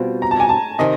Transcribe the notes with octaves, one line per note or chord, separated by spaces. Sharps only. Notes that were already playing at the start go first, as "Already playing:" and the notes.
Already playing: B2 G3 C4 F4
A#5
A5
G#5
A5
C3 D#3 D#5